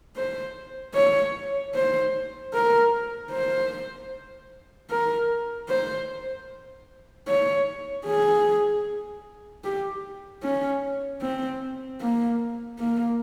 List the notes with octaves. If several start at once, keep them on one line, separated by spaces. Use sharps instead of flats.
C5
C#5
C5
A#4
C5
A#4
C5
C#5
G#4
G4
C#4
C4
A#3
A#3